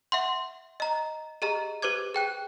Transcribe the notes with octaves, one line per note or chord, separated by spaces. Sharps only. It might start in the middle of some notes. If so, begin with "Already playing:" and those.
E5 F#5 C6
D#5 A#5
G4 G#4 D#5 A#5
G4 B4 C5 D6 G#6
G#4 G5 F#6